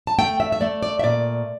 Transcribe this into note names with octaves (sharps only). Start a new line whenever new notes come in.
A5
A3 G5
E5
E5
A3 D5
D5
E5
A#2 D5